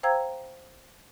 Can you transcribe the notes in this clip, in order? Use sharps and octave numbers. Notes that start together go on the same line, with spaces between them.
C5 F5 G5 A#5 E6 G#6